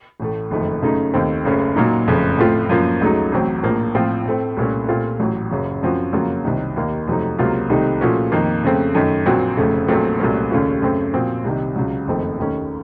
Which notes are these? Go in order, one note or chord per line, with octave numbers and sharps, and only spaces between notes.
A1 A2 A3
F#1 F2 D#3 A3
F#2 C#3 A3 D#4
D#2 D#3 A3 C4
F#1 F#2 C#3 A3 C#4
A#2 F#3 A#3 D#4
F#1 F2 C#3 A3
A2 F3 A3 C4 F4
F#2 F3 A#3
C#2 C#3 F#3 A3 D#4
A1 A2 F#3 C4
A#1 A2 F3 A#3
A2 F3 C4 F4
A2 A3 C4
C2 A#2 A3 C#4
A#2 A3 C4 F4
A1 A2 F#3
F#1 F#2 C#3 F#3
F#2 F3 C4 F#4
F2 C#3 F#3 A#3 F4
C2 C3 D#3
D#2 D#3 A#3
F2 C3 F#3 A3 D#4
C#2 C3 F#3 A#3 F4
C2 C3 D#3 A3 D#4
A#2 F3 A3 C#4 F#4
F2 D#3 A#3
F2 C#3 A3 C4
F#2 D#3 A3
A#1 A#2 F#3 C4 F#4
F1 F2 C#3 A3
A#1 A#2 F#3 A3 C4
C2 A#2 F#3 A3 C#4
D#2 C#3 A3 C#4 F4
F#2 C#3 A3 C4
A#2 F3 C4 F#4
C2 C3 D#3
C#2 C#3 F#3
F#1 F2 D#3 A3 C4
D#2 D#3 A3 C#4